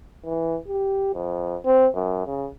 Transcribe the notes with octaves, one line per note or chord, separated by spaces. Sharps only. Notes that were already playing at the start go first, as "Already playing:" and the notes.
E3
G4
F2
C4
F#2
C#3